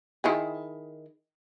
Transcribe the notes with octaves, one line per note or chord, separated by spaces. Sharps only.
D#3 E4 G#4